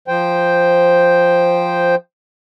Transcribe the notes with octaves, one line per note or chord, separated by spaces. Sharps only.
F3 C5 G5